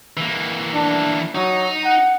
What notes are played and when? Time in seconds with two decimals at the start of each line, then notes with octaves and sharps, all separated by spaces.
0.17 E3 A#3
0.74 D4
1.35 F#3 D#4 D#5
1.85 F#5